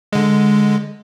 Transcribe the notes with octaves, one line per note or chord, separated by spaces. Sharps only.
D3 G#3